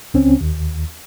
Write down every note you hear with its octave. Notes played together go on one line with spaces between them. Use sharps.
C#2 C4 C#4
D#2